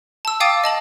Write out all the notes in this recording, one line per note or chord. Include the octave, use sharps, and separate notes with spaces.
A5 E6
F5 G5 D6 D#6 A6 D#7
D#5 A5 F#7